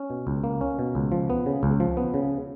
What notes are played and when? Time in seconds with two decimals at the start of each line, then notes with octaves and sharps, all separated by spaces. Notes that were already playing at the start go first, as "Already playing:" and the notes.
Already playing: C#4
0.10 B2
0.27 C#2
0.44 A#3
0.61 C#4
0.79 B2
0.95 C#2
1.12 F3
1.30 B3
1.46 C#3
1.63 C#2
1.80 F3
1.97 B3
2.14 C#3